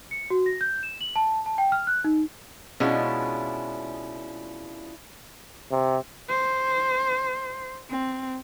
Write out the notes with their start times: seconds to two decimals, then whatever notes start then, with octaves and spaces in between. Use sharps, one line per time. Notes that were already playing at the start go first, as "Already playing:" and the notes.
0.11 C#7
0.30 F#4
0.46 A#6
0.61 G6
0.83 E7
1.01 F#7
1.16 A5
1.46 A5
1.58 G5
1.72 F6
1.87 F#6
2.04 D#4
2.80 B2 G#3 C#4 D4 E4 F4
5.71 C3
6.29 C5
7.90 C4